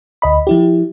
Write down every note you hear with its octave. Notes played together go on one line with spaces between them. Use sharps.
D2 D#5 B5
F3 E4 G4